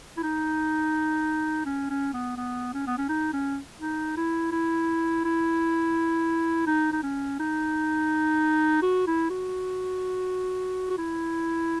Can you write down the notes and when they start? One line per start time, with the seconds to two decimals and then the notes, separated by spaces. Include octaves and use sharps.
0.17 E4
0.23 D#4
1.65 C#4
1.90 C#4
2.14 B3
2.37 B3
2.74 C#4
2.87 B3
2.98 C#4
3.09 D#4
3.33 C#4
3.81 D#4
4.17 E4
4.52 E4
5.25 E4
6.67 D#4
6.92 D#4
7.03 C#4
7.39 D#4
8.83 F#4
9.07 E4
9.30 F#4
10.90 F#4
10.98 E4